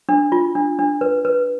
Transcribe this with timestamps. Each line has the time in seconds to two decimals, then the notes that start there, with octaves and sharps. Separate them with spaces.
0.09 D4
0.32 F4
0.55 D4
0.79 D4
1.01 B4
1.25 B4